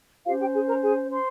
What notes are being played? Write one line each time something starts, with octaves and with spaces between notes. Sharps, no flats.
C#4 F4 G4 C5 F5
G4 G5
G#4 G#5
A#4 A#5
G#4 G#5
C5 C6